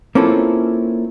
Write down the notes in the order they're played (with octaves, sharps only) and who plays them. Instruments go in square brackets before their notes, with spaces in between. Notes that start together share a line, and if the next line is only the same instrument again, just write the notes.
[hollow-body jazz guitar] A#3 C4 C#4 E4 F4 A4